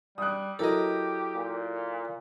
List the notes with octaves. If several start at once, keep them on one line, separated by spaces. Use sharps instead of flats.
G3 D#6 F#6
F#3 E4 G4 A4 A#4 D#5
A#2